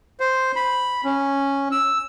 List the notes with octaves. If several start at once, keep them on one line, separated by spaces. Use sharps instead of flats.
C5
B5
C#4
E6